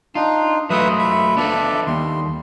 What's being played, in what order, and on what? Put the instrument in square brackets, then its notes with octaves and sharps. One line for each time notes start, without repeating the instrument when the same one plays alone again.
[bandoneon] D4 D#4 [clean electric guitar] F4
[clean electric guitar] F#3 A3 F4 [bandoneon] B4 E5 D#6
[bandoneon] E5 B5
[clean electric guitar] B3 F4 A4 [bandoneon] D4 D5 E5
[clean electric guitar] D#2 [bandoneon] G3 C6